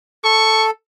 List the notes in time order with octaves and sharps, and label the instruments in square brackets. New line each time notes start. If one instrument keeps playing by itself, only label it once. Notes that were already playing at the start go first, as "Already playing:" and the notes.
[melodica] A4 [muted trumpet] C#6